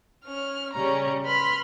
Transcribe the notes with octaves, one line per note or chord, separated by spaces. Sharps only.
C#4 F6
C#3 G3 C#4 A#5
B4 B5 C6 F6